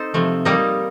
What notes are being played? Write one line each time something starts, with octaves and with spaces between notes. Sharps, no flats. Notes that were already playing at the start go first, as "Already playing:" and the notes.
Already playing: C4 D#4 A4 C5
C3 F3 A3
G3 A#3 D#4 A#4 D#5